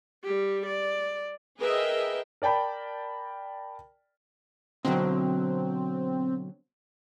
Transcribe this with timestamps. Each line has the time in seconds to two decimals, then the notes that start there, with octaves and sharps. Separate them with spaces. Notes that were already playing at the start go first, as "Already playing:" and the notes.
0.23 G3 G4
0.66 D5
1.58 G#4 A#4 B4 D#5 E5 G5
2.42 A#4 D5 G5 A5 B5
4.85 B2 D3 F#3 C4